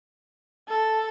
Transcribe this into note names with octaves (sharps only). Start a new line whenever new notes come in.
A4